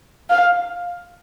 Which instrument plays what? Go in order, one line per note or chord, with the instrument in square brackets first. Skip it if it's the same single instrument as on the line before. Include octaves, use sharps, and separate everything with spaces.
[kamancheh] F5